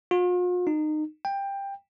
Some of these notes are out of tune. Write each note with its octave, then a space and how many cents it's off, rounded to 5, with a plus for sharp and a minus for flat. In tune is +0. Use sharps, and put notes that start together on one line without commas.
F4 +45
D#4 -25
G5 +15